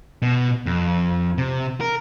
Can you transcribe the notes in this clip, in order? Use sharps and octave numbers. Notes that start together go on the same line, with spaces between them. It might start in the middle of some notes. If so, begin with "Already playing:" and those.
B2
F2
C3
A#4